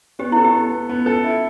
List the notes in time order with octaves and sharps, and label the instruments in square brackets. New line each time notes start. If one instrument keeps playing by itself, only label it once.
[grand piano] B3 [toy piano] G4
[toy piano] E4 [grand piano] A4
[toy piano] G4
[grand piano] B3
B3
B3
A4
E4